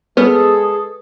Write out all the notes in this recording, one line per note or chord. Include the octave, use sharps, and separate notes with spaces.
G#3 B3 G#4 A4 B4